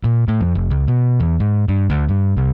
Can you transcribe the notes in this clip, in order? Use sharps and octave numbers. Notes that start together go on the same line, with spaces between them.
A#2
A2
F2
F1
C#2
B2
E2
G#2
G2
D2
G2
C2